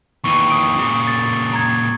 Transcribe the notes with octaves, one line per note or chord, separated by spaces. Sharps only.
D#2 E3 C#6 D#7
D#6 D7
A#2 C#3
A6
A#5 G#6